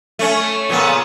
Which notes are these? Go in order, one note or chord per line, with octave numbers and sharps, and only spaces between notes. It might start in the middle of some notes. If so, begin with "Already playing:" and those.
A3 C#4
A#2 C#3 B3